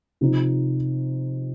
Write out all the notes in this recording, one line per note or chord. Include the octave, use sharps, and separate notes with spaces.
C3 F3 C4 D#4